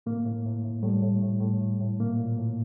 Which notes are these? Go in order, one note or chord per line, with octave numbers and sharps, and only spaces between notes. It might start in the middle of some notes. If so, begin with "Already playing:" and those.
A2 A#3
A2
A2
A2
A2 G3
A2
A2
A2
A2
A2
A#2 A#3
A#2
A2